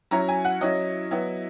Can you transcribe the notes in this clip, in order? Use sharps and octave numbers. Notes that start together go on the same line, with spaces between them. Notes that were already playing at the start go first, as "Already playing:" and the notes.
F#3 C#4 E4 A#5
G#5
F#5
F#3 C#4 E4 D#5
F#3 B3 E4